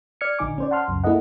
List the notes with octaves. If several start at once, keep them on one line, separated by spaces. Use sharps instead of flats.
D5 F6 G#6 C#7
A#1 D3 D#4 G#5 D6
C#4 C5 D5
F#5 A5 C6 F6
C#2 F#2 C#3
A#3 E4 G#4 A4 D#5 F#5